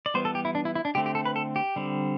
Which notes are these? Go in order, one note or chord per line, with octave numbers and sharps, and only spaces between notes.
D5
E3 G3 B3 C5
A4
G4
E4
D4
E4
E4
D4
D3 A3 C4 G4
G4
A4
B4
A4
G4
D3 G3 C4